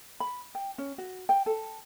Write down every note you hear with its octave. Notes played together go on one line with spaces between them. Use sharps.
B5
G5
C#4
F#4
G5
A4